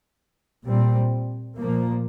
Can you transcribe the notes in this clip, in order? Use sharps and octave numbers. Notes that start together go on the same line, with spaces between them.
A#2 G3 C4
A#2 F3 A#3